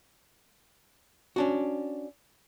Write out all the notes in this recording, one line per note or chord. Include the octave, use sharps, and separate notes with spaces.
C#4 D4 F#4